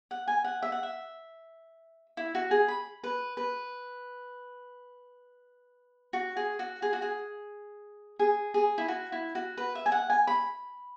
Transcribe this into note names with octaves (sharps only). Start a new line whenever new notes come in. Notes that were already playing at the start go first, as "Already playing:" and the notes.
F#5
G#5
F#5
E5
F#5
E5
E4
F#4
G#4
B5
B4
B4
F#4
G#4
F#4
G#4
F#4
G#4
G#4
G#4
E4
F#4
E4
F#4
B4
E5
G#5
F#5
G#5
B5